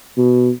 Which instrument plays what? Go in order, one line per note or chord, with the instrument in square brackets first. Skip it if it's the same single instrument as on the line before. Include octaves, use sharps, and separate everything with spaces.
[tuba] B2